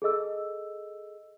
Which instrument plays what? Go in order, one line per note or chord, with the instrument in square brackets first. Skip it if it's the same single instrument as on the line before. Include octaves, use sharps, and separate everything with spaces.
[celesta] G#4 A4 D#5 E6